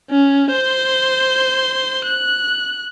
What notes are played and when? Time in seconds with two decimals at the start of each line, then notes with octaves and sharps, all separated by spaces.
0.11 C#4
0.52 C5 C6
2.05 F#6